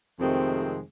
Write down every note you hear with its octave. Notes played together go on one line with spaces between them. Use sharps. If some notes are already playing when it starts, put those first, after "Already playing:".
F2 C3 D#3 G#3 A3 C4